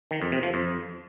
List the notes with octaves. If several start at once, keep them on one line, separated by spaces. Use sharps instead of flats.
D#3
F2
C3
F3
F2